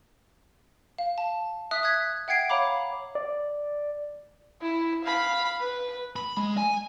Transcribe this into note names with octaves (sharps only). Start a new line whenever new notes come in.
F5
A5
E5 D#6 F#6 B6
D#6 F#6 G#6 B6
E5 F#5 G5 G#6 C7 D7
C#5 F5 A#5 B5 D6
D5
E4
F5 B5
B4
B5
G#3
G#5